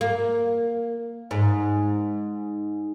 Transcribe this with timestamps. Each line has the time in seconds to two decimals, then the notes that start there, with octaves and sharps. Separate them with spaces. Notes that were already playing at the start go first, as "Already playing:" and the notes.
0.01 A#3
1.31 G#2